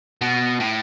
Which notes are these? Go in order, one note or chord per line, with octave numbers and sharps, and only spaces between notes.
B2
A2